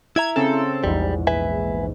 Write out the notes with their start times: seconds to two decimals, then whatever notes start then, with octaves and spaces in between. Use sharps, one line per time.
0.16 E4 E5 A#5 G#6
0.36 C#3 C4 A4
0.84 A#1 E2 G#2 G3
1.27 B4 E5 G#5